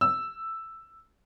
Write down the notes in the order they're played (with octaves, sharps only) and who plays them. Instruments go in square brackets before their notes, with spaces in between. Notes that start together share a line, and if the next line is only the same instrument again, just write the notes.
[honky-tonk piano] E6